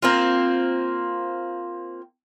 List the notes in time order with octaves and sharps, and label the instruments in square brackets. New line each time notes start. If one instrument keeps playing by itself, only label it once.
[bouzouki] A#3 C4 F4